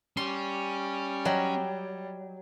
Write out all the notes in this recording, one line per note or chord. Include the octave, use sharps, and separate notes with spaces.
G3 C#4 C6
F#3 D5 D#5 G5